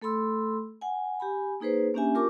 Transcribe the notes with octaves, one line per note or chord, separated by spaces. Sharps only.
A3 A4 B5 C6 E6
F#5 G#5
G4 G#5 B5
A#3 D#4 G#4 B4 C5
A#3 C#4 D4 G4 E5 G#5
F4 G4 A#4 A5 C#6 D6